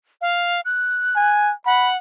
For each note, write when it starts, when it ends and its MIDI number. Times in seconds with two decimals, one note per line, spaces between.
0.21 0.61 77
0.65 1.52 90
1.16 1.53 80
1.66 1.97 78
1.66 1.88 83